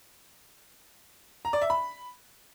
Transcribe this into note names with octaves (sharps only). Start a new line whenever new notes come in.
A#5
D5
E5
B5